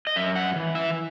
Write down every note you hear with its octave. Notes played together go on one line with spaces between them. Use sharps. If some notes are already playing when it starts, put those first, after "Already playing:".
D#5
F#2 E5
F#5
E3
E5